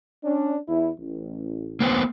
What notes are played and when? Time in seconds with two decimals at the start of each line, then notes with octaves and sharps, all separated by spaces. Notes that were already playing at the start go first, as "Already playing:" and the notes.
0.24 C#4 D4
0.68 E2 E4
0.98 A1
1.80 A#3 B3 C5